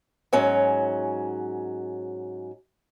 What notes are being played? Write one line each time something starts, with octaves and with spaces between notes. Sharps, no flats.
G#2 F#3 C#4